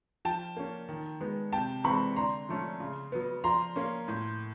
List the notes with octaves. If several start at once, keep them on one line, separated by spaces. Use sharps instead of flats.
F3 G5 A5
A#3 C#4
D#3
G#3 B3
C3 G5 A5
E3 G#3 C4 B5 C#6
D3 A#5 C6
F3 A3 C#4
C#3
F#3 B3
F3 A#5 C6
A#3 C#4
A2